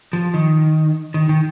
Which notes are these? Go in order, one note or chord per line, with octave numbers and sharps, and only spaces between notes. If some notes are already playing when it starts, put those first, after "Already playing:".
F3
D#3
D#3
D#3